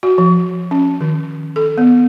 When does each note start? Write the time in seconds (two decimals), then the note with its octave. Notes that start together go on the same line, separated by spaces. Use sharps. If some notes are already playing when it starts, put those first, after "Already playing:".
0.03 F#4
0.18 F3
0.71 C#4
1.01 D#3
1.56 A4
1.78 B3